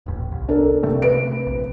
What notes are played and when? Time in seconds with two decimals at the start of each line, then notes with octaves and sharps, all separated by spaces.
0.06 D#1 A1
0.32 C2
0.48 D4 A4 A#4
0.83 C3 A3 C4
1.02 B4 D7
1.46 A#1